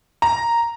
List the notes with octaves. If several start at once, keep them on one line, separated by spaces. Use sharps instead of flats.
A#5